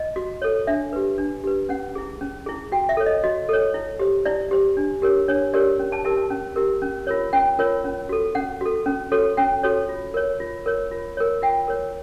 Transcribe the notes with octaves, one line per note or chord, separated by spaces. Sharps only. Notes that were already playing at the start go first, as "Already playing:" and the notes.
Already playing: D#5
F#4
A4 C#5
D4 E5
G4 B4
D4
G4 B4
C#4 F#5
E4 G#4
C#4
E4 G#4
F#4 G5
E5
A4 C#5
D#5
F#4 D#5
A4 C#5
E4
G4 C5
E4 D5
G4 C5
D4
G4 A#4 C#5
D4 C#5
G4 A#4 C#5 D5
C#4
A5
E4 G4 A#4 A5
A5
C#4
E4 G4 A#4
C#4
F4 A#4 C#5
C#4 G5
F4 A#4 C#5
C#4
F#4 A4
C#4 F#5
F#4 A4
C#4
F#4 A4 C#5
C#4 G5
F#4 A4 C#5
F4
A#4 C#5
F4
A#4 C#5
F4
A#4 C#5
F4 G5
A#4 C#5